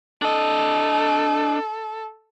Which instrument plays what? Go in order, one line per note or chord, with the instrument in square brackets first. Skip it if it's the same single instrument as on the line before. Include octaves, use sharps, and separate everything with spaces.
[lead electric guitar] D4 D#5 [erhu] A4